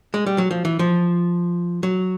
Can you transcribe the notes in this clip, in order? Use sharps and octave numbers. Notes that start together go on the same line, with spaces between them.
G#3
G3
F#3
F3
E3
F3
F#3